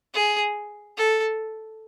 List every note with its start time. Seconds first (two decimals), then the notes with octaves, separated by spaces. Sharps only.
0.14 G#4
0.97 A4